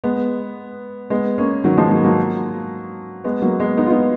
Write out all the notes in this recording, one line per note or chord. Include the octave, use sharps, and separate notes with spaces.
G#3 B3
G#3 B3
A#3 C#4
D#3 F#3
F3 G#3
F#3 A#3
F#3 A#3
G#3 B3
F#3 A#3
G#3 B3
B3 D#4
F4
B3 D#4